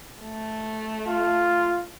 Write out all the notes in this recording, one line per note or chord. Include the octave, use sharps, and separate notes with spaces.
A3
F4